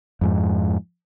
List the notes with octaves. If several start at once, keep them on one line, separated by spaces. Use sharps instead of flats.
F2 G#2